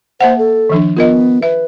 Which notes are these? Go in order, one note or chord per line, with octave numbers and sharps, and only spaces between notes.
A#3 C5 E5 F#5
A4
D#3 F3 D4
B3 F4 A#4 D#5
B4 E5